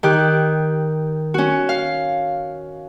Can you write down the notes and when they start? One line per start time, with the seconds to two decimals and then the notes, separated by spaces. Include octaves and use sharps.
0.03 D#3 G4 F#6
1.34 C#4 F#4
1.69 F5